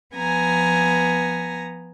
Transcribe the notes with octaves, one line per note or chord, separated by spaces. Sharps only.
F3 B3 G#5 A#5 A#6